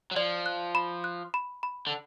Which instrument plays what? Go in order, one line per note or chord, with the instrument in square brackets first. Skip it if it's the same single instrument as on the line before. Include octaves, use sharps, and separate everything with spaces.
[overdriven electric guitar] F#3
[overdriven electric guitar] F3 [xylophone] D5
[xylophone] F#6
B5
F#6
B5
B5
[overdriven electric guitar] D3